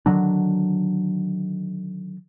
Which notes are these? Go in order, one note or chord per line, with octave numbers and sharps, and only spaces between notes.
D3 D#3 F#3 D4